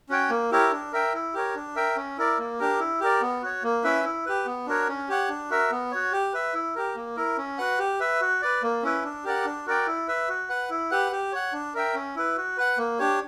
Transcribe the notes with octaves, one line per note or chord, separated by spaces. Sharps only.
C#4 F#4 C#5 G5
A#3
E4 G4 A#4 C#5
D4
A#4 E5 G5
E4
G4 A#4 C#5
D4
A#4 E5 G5
C#4
E4 A#4 D5
A#3
D4 G4 A#4
E4
G4 A#4 D5
B3
F#4 C#5
A#3
C#4 E4 B4 E5
E4
G4 B4
B3
D4 F#4 A#4 C#5
C#4
G4 C#5 F#5
D4
F#4 A#4 E5
B3
F#4 C#5
G4
B4 E5
E4
G4 A#4
A#3
E4 A#4
C#4
F#4 B4 F#5
G4
B4 E5
F#4
B4 D5
A#3
C#4 E4 B4
D4
G4 A#4 D5 F#5
D4
F#4 A#4 D5 G5
E4
B4 E5
F#4
B4 F#5
E4
G4 B4 F#5
G4
C#5 F#5
D4
A#4 E5 G5
C#4
E4 B4
F#4
B4 F#5
A#3
D4 G4 C#5